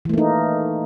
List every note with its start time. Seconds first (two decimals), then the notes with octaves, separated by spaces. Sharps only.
0.05 E3
0.09 A3
0.14 A#3
0.18 D#4